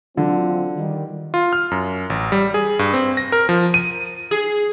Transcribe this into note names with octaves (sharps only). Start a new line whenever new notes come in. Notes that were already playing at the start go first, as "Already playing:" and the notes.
D3 F#3 C4 F4
D#3 G3
F4
F6
F#2
A1
G3
G#4
G2
C4
A#6
A#4
F3
D#7
G#4